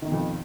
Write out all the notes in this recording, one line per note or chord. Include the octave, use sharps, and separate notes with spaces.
F2 B2 D#3